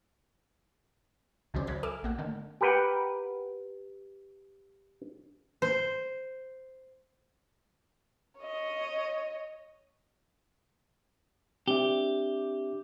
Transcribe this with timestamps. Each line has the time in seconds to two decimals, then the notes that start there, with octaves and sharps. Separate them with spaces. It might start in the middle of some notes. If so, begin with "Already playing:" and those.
1.54 C#2 C#3 F#3 C#4 C5 D5
1.67 C#2 F#3 C5 C#5 B5
1.83 A4 E5 G#5 D6 E6 F6
2.03 A1 A#3 F#5
2.18 D3 D#3 A3 A#3
2.61 G4 A#4 B4 F#5 G5
5.62 C5
8.39 C#5 D#5
11.68 C4 D4 G4 E5